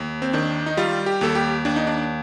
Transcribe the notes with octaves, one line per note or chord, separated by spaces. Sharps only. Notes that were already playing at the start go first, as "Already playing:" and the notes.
Already playing: D#2
C4
D#3 D4
D#4
G3 F4
G4
D#2 A4
G4
D#2 D4
D#4
D4